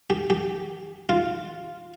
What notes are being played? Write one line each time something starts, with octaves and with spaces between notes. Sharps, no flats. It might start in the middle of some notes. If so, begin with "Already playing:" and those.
G4
G4
F4